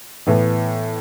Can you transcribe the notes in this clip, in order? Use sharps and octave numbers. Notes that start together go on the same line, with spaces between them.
A2 E3 B3